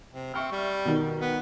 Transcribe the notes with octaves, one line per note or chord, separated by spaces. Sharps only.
C3
C4 E5 C#6 F6
G3
B2 D#3
B3